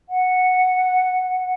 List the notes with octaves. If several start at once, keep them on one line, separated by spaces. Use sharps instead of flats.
F#5